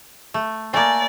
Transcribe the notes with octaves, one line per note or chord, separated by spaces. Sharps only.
A3
A3 A#3 D5 G#5